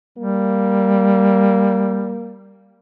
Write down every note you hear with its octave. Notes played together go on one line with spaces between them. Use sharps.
G3 A#3